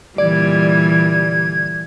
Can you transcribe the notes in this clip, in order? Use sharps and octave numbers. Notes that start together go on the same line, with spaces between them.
A#2 D3 E3 G3 D5 G#6